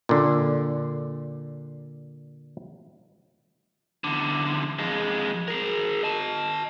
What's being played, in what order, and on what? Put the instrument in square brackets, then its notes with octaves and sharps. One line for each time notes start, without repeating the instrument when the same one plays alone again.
[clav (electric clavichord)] A#2 D3
[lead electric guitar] E2 D3
F2 G#3
G#4 A#4
D#5 A5